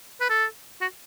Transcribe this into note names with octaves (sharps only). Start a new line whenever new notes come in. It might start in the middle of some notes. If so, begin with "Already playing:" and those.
B4
A4
F#4